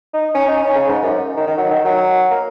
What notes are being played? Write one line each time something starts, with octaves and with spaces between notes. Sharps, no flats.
D#4
C#4
D#4
C#4
C#3
G#2
F#2
D#3
D#3
F#3
D#3
F#3
A#3